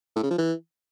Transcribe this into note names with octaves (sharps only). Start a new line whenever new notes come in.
A2
C#3
F3
E3